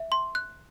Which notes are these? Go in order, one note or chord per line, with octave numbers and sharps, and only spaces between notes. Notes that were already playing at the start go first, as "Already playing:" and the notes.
Already playing: E5
C6
F#6